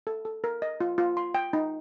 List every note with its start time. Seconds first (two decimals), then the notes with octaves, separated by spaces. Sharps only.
0.07 A4
0.25 A4
0.44 A#4
0.62 D#5
0.81 F4
0.98 F4
1.17 C6
1.35 G5
1.53 D#4